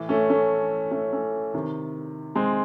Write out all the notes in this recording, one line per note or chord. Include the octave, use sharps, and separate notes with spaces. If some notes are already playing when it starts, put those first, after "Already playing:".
Already playing: A2 E3
A3 C#4
A3 C#4
A3 C#4
A3 C#4
C3 D#3
G#3 C4